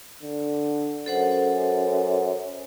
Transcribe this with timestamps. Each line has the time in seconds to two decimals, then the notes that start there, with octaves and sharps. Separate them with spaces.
0.22 D3
1.06 F#2 A4 C5 F#5